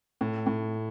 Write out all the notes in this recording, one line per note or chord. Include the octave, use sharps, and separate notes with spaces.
A2
A2